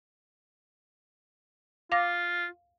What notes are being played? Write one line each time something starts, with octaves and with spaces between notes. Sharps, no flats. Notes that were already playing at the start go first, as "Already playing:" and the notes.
F4 F5 D6 A#6